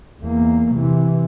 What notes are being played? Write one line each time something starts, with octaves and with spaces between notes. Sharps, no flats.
E2 A#3
C3 E3